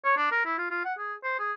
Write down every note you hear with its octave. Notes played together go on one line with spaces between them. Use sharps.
C#5
D4
A#4
E4
F4
F4
F#5
G#4
C5
G#4